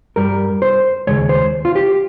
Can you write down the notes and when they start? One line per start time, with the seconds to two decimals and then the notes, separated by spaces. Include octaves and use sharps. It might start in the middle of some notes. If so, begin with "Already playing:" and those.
0.16 G2 G3 A#4
0.62 C5
1.07 D#2 C#3 G#3 C#5
1.29 C5
1.65 F4
1.76 G4